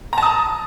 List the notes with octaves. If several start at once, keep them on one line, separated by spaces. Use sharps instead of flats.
A5 A#5 D#6